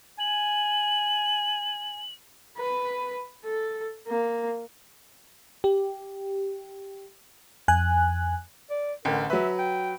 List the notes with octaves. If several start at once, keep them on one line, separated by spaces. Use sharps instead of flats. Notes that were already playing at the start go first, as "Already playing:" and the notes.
G#5 F#7
B4
A4
A#3
G4
F2 G#5 F#6
D5
A1 D3 A#4 G5
F#3 B4 E5
G5